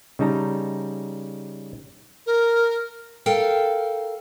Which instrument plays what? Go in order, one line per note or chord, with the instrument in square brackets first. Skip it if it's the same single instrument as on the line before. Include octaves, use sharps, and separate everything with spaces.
[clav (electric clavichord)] C#3 G3 D#4 A5 A#5
[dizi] A#4
[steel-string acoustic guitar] A4 A#4 F5 G5